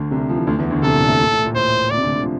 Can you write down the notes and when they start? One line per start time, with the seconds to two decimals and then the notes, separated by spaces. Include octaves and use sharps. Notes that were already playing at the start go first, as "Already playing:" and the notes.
Already playing: D2 D3
0.11 C2 C3
0.29 F3
0.37 E3
0.46 D2 D3
0.58 E2 E3
0.70 D2 D3
0.83 C2 C3 A4
0.94 A#2
1.07 A2
1.19 A#2
1.31 A2
1.44 A#2
1.55 A2 C5
1.91 A#2 D5
1.97 C3
2.02 D2 D3
2.15 D3
2.22 F3